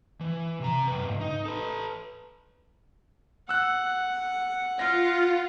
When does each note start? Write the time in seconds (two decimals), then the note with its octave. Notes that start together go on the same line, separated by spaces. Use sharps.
0.21 E3
0.61 C3 A#5
0.88 F#2 B4
1.04 C#2 G#2
1.21 D#4
1.46 A4 B4
3.49 F#5 E6 F#6
4.79 F4 A#6